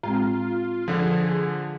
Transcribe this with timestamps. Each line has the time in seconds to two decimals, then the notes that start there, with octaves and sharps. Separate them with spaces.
0.03 A2 G#3 C4 F4
0.88 D3 F3 G#4